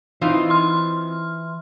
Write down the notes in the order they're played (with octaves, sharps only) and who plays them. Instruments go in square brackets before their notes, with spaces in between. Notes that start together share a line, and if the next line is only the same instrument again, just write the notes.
[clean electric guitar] E3 [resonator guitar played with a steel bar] C4 D#4 F4
[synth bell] C6 F6